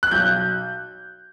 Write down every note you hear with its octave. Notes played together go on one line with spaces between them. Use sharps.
F#6
B1 G6